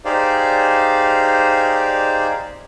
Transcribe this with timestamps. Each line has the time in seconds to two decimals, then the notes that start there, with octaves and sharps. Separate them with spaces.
0.05 D#4 G4 G#4 C5 D5 F5